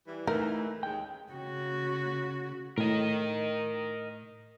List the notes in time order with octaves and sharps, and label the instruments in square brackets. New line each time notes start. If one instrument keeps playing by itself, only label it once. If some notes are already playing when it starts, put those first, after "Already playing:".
[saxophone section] E3 G3
[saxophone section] E3 [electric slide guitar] A3 D#4 [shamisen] A#4
[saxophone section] D#2 C#3 G#3 [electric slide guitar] G5
[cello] C#3 F#4
[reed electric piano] A2 [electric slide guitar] A#4 D#5